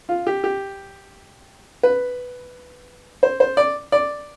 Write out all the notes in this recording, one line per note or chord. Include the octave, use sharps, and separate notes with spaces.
F4
G4
G4
B4
C5
C5
D5
D5